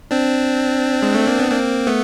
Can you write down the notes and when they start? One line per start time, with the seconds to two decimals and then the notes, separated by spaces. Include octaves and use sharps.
0.11 C4 D4
1.02 G#3
1.15 A3
1.27 A#3
1.39 B3
1.51 A#3 C4
1.87 A3 B3